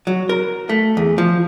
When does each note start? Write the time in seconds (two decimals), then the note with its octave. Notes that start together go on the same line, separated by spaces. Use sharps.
0.07 F#3
0.29 A#4
0.69 A3
0.97 E2
1.18 F3